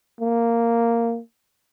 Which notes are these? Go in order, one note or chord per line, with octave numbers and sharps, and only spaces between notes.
A#3